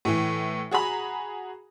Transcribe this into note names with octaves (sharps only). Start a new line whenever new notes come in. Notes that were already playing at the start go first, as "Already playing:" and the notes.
A2 E3
F#4 G#4 A#5 B5